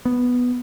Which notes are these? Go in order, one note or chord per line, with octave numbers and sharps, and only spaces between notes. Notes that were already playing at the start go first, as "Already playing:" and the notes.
B3